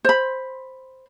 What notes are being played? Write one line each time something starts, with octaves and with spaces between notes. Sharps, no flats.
C5 B5